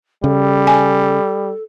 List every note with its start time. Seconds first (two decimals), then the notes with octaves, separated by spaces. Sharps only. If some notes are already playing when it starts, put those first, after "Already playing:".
0.24 C#3 G3 A4
0.67 G#5